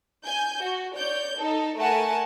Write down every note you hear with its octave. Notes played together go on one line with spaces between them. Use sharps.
G#5 G6
F#4
C#5 D5 G6
D#4 A4
A3 A#4 F#5 G#5 A5